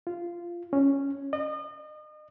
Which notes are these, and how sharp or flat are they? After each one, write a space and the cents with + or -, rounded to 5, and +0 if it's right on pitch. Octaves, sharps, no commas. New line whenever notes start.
F4 -15
C#4 -5
D#5 -35